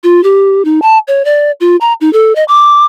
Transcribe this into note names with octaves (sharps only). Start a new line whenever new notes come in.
F4
G4
D#4
A5
C#5
D5
F4
A#5
D#4
A4
D#5
D6